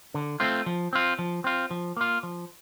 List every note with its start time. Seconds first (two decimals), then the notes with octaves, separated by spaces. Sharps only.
0.14 D3
0.40 A3 C4 F4
0.66 F3
0.93 C4 F4
1.19 F3
1.44 C4 F4
1.71 F3
1.97 A#3 F4
2.23 F3